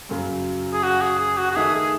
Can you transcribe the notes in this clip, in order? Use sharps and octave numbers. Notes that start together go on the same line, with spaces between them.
F#2 C#3 F#3
G#4
F#4
G#4
G#4
F#4
F#4
D#3 A3 D#4 G#4 A4 E5
G#4